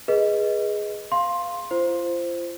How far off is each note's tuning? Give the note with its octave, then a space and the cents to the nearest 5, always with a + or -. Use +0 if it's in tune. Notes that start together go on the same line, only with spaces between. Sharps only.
G#4 +0 B4 -15 D#5 +10
F5 +0 C6 +10
F4 -35 C5 +0